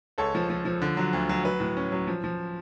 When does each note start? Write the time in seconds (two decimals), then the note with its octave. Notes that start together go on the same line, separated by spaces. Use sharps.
0.18 C#2 A4 C#5
0.35 F3
0.50 F3
0.65 F3
0.82 D3
0.97 F#3
1.13 D2
1.29 F#3
1.44 F#3 B4
1.60 A2
1.77 C#4
1.92 F#3
2.07 F3
2.24 F3